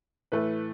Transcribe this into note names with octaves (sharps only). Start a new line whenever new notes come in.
A2 E3 A3 B4